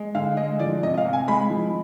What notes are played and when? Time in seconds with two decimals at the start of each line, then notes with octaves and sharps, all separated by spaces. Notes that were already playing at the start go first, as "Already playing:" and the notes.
Already playing: G#3
0.15 D3 F5
0.37 G#3 D#5
0.59 F3 D5
0.83 C3 D#5
0.94 D#5
0.97 F5
1.05 C3
1.13 G#5
1.28 G#3 B5
1.50 F3